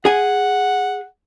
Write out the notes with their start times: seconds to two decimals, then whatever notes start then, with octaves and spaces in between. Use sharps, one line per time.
0.05 G#4 F#5 G#5